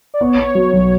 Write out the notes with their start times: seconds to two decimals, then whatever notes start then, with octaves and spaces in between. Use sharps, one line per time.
0.14 D5
0.21 B3 C#5
0.38 B3
0.55 F#3
0.73 B1